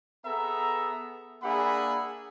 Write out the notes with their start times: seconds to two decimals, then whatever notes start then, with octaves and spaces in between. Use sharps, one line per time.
0.25 B3 G#4 A4 E5 A#5
1.43 A#3 D4 G#4 E5 F#5 B5